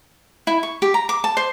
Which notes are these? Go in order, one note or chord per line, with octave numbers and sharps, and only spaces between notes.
E4
C#6
G4
A#5
D6
A5
C5